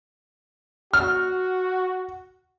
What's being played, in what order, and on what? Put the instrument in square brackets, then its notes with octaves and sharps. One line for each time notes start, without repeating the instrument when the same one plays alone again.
[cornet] F#4 [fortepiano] F6